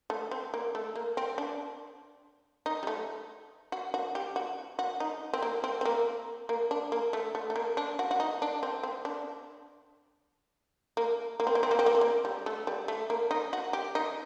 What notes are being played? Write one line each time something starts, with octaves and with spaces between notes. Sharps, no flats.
A3
C4
A#3
A3
A#3
C4
D4
D#4
G3
A3
F#4
F#4
G4
F#4
F#4
D#4
C4
A#3
C4
C4
A#3
A#3
D4
A#3
A3
A3
A3
A#3
D4
F#4
F#4
D#4
D4
C4
C4
D4
A#3
A#3
C4
A#3
C4
A#3
C4
A#3
C4
A#3
G3
A3
G3
A3
A#3
D#4
F#4
G4
D#4